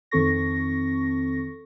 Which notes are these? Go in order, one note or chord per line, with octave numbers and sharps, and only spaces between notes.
F2 D#3 C4 A4 C#6 A#6